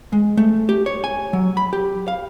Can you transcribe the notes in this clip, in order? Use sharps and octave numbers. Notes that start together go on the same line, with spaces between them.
G#3
A3
G4
C#5
G#5
F#3
B5
G4
F5